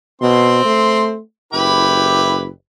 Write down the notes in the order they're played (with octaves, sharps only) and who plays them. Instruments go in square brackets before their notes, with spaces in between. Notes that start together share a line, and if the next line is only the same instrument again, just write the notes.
[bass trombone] B2 [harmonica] C4 C6
[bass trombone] A3
[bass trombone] F#1 [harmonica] E4 G4 B4